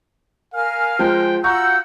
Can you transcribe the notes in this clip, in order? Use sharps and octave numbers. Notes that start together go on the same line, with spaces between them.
A#4 F5 G#5 F6
F3 G#3 G5
F4 F#4 F#5 A#5 C#6 E6 G6